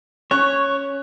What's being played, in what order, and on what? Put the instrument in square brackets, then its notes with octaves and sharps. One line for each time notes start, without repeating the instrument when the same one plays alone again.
[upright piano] C#4 C#6 F#6 [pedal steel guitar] C#5